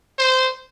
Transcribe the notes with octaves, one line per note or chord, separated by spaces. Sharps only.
C5